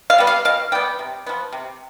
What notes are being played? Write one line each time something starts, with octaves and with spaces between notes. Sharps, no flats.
F5
G3 B3
F5
B2 F5
G3 B3 G5
C3
F3 B3
C3